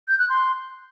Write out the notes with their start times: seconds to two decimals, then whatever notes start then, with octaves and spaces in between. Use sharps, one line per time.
0.08 G6
0.19 F#6
0.29 C6